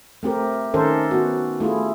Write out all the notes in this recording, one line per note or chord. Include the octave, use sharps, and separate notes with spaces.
A3 C4 G4 A#4
D#3 C#4 G4 A4 A#4 C5
B3 F#4
A3 E4 F4 G#4